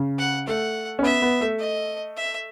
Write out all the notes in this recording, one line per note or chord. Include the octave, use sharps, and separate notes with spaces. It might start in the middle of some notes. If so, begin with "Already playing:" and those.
Already playing: C#3
F#5
A3 F#5
C#4
B3 E5
B3
A3
D#5
E5